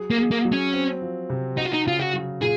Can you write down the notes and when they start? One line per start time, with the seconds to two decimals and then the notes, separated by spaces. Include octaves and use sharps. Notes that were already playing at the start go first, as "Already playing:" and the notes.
Already playing: F#3 G#4
0.11 A#3
0.17 G#4
0.31 A#3
0.45 F#3
0.52 C#4
0.74 C4
1.02 F3
1.30 C3
1.57 D#4 F#4
1.66 F4
1.73 D#4
1.86 C#3 F4
2.00 F#4
2.13 F#3
2.42 A#2 G#4